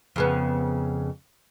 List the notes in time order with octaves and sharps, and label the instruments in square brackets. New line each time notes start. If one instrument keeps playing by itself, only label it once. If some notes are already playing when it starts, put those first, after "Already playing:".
[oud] F2 C#3 B3